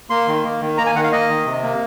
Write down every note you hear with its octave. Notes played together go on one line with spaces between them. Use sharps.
A#3 C6
D#3
A#3
D#3
A#3 A#5
G#5
D#3 F#5
F5
A#3 D#5
D#3
C3
A#3